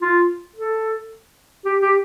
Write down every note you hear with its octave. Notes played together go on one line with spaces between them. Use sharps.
F4
A4
G4
G4